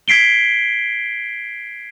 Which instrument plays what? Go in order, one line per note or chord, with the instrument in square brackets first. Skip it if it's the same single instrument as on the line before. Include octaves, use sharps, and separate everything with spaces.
[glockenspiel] G#6 B6 C7 D7 G7